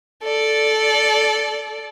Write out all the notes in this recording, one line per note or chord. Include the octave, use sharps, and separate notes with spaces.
A4 D5